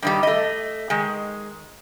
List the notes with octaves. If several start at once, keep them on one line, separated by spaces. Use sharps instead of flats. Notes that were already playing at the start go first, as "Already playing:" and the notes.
G2 D#3 G3
A3 D#5
D#3 G#3